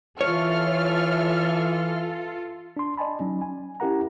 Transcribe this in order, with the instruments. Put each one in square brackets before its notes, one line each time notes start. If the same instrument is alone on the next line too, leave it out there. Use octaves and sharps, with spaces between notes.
[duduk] E3 [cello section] F4 A4 [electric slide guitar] C#5 [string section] E5 F6
[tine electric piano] D4 C6
D5 D#5 G#5 A5 B5
F#3 C#4 D#4
G#5
C#4 E4 G4 A#4 F#5 A#5